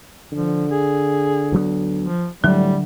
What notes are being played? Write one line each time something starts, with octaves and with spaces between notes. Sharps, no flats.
D3 F3
G#4
D2 F#3 B3
F3
A2 D3 F#3 G3